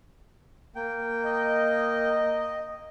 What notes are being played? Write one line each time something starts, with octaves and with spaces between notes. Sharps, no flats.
A#3 G5
D#5